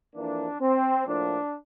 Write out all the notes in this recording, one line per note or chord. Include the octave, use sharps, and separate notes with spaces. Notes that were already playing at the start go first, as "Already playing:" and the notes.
F2 E3 A#3 D4
C4
A2 F3 A#3 D4